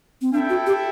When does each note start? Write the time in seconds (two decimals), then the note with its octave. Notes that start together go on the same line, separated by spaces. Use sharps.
0.21 C4
0.33 D4 E4 A4 E5 G5
0.49 F#4
0.67 G4